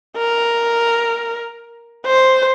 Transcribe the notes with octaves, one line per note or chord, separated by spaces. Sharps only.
A#4
C5